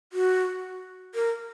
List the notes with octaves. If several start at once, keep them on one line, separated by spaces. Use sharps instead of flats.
F#4
A#4